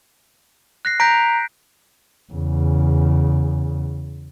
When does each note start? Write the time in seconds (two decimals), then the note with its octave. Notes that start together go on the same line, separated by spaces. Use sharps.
0.85 F#6 A#6 C7
1.00 A#5 G6 B6 D7
2.33 E2 C#3